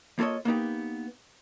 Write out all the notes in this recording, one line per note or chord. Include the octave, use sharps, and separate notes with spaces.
A#3 F4 A4 C#5 D#5
A#3 B3 D#4 G4